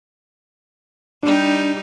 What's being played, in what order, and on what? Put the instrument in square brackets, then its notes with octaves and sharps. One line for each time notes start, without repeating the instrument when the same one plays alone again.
[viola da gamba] G3 D#4 G4 [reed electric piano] D4